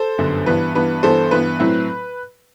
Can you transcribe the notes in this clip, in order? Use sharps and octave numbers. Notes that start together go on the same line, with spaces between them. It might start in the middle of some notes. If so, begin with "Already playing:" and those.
Already playing: A4 C5
G1 F#2 D3
G2 E3 B3 B4
G2 E3 B3 B4
G2 E3 B3 A4 C5
G2 E3 B3 B4
A2 F#3 C4 E4